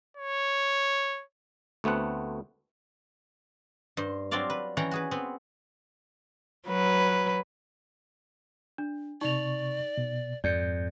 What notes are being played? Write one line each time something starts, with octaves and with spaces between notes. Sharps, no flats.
C#5
D2 A3 B3 C4 F#5
G2 C5
F#3 C4 D4 F4 D5 F5
B4
E3 C#4 F#5 G5 A#5
F#4 G#4 B4
B3 C4 B4
F#3 B4
D4
C3 D#4 D5 C#6 F7
B2
F2 G#2 D5 G6 C#7